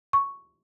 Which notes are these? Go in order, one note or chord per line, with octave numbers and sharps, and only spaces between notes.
C#6